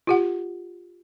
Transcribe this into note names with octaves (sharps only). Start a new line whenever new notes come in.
F4 G4 F#5